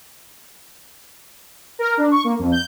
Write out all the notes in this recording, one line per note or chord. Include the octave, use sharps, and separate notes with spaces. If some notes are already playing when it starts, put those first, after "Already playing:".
A#4
D4
C#6
A#3
F2
G6